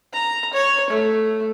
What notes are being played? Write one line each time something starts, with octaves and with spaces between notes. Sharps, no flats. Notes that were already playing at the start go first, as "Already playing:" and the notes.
A#5
C#5
A3